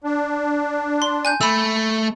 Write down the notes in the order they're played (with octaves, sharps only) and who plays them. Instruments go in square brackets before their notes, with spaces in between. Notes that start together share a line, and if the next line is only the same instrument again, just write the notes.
[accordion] D4
[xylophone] C6
G#5 F#6 G6
[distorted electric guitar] A3 [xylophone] B5 E6